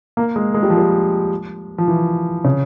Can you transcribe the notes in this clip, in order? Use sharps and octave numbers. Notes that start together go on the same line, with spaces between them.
A#3
G#3
G#3
G3
F3
G3
F3
E3
C#3